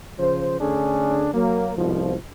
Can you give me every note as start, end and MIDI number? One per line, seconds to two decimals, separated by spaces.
0.19 0.59 49
0.19 0.59 53
0.19 0.59 72
0.60 1.28 50
0.60 1.28 57
0.60 1.28 61
0.60 1.28 62
0.60 1.28 68
1.34 1.72 54
1.34 1.72 58
1.77 2.14 36
1.77 2.14 44
1.77 2.14 47
1.77 2.14 53